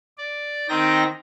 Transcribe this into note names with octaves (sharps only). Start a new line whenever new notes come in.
D5
D#3 C4 D#4 G5 A#6